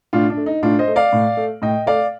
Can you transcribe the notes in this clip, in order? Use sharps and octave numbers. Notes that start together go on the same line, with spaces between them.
A2 D4 F4
D4
A3
D#4
A2 D4 F4
C5 D#5
A3
D5 F5
A2
A3
A2 D#5 G5
A3 D5 F5